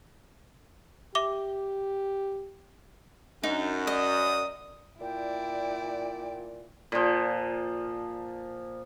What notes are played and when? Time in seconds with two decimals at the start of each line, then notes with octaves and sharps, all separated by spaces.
1.15 G4 E5 D6 G7
3.44 F#2 D4 D#4
3.87 D5 D#5 D#6
5.01 A#2 E4 D5 G5
6.92 A#2 F3